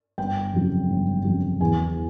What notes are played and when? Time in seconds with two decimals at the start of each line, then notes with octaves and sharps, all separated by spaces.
0.18 G1 G5
0.53 F2 C#3 F#3
0.90 G1
1.25 F2 C#3 F#3
1.60 E2 G#5